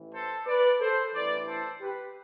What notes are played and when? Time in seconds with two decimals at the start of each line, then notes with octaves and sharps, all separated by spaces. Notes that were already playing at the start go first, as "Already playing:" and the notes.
Already playing: A1 A2 E3
0.13 A4 C5
0.47 B4 D5
0.80 A4 C5
1.13 A1 G2 E3 B4 D5
1.47 A4 C5
1.80 G4 B4